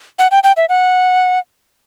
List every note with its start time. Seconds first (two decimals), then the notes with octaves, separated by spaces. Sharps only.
0.19 F#5
0.31 G5
0.43 G5
0.57 E5
0.69 F#5